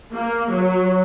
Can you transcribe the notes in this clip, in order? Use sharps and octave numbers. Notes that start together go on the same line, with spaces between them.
A#3
F#3